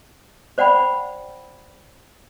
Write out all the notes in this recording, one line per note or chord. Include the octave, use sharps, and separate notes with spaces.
C5 D5 F#5 G5 B5